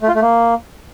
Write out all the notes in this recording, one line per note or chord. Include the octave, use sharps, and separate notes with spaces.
A3
F4
A3
A#3